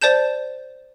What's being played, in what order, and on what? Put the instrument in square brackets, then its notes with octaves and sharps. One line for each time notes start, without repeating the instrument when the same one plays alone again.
[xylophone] C5 D5 A5 G6 E7